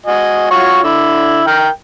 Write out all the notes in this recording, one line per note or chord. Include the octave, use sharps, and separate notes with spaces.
F#4 D#5 G#5
F4 F#4 C#5
D3 E4
A#4 G5